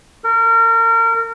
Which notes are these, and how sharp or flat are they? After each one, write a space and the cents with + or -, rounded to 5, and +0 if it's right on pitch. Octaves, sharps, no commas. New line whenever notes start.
A#4 -30